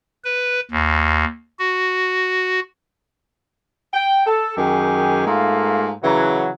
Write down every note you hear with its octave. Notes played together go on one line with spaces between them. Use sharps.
B4
D#2
F#4
G5
A4
F#2 D#3 G4 G#4
G#2 A3 A#3 F4
C#3 E3 F#3